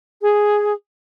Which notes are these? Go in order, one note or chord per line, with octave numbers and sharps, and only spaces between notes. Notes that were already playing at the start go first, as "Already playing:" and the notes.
G#4